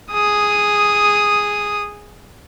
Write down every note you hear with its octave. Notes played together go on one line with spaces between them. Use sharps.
G#4 D#6